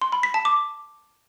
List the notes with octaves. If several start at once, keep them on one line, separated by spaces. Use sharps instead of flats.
C6
B5
B6
A5
D6